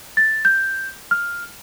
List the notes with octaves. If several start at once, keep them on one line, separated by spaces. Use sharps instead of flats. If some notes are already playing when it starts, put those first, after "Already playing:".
A6
G6
F6